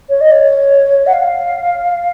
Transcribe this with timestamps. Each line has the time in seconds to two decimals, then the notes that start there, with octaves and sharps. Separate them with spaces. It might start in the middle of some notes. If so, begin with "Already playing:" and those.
0.09 C#5
0.21 D#5
0.31 C#5
1.06 F#5
1.13 F5